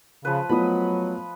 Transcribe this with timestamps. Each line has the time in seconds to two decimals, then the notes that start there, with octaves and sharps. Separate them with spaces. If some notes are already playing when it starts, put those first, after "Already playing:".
0.25 C#3 F3 B4
0.49 F#3 A3 B3 F4 D#5 B5